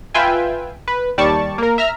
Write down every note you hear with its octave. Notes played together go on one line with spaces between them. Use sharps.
F4 B4 E5 G5 G#5
B4
D#2 G3 D5 A5 C#6 A6
A#3 A#4
E5 A#5 F6